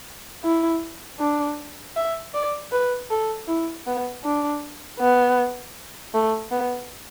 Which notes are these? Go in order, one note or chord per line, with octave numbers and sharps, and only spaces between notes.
E4
D4
E5
D5
B4
A4
E4
B3
D4
B3
A3
B3